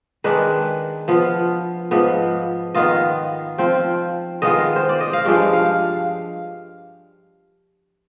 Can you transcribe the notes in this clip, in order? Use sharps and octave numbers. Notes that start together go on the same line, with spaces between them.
D#3 G#3 D4 B4
F3 B3 F4
G#2 F3 B3
D#3 B3 F4 D#5
F3 C4 F4 G5
D#3 G#3 B3 F4 D#5
C5
D5
D#5
F5
G2 F3 G#3 D4 G5
F5